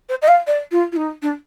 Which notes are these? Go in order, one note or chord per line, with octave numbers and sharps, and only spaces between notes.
C5
D#5
F5
D5
F4
F4
D#4
D4